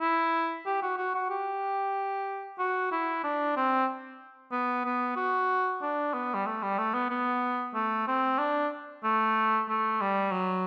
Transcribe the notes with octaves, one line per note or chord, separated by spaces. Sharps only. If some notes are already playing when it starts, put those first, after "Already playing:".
E4
G4
F#4
F#4
F#4
G4
F#4
E4
D4
C4
B3
B3
F#4
D4
B3
G3
A3
G3
A3
B3
B3
A3
C4
D4
A3
A3
G3
F#3